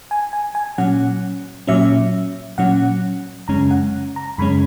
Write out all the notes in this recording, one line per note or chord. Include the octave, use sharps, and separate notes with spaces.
G#5
G#5
G#5
A#2 F#3 C#4 F#5
A#2 F#3 C#4 E5
A#2 F#3 C#4 F#5
F#2 C#3 G#3 C#4 A#5
F#5
A#5
F#2 C#3 G#3 C#4 B5